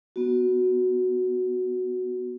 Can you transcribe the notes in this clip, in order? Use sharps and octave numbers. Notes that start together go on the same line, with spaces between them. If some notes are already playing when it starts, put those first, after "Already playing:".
B3 F#4